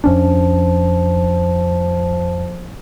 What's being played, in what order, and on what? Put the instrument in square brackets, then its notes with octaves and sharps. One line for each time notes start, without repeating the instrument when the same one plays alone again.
[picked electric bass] F2 C#4 D4 [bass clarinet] F3